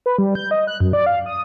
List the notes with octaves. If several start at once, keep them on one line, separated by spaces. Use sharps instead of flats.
B4
G3
G6
D#5
F#6
F#2
D5
F5
D#6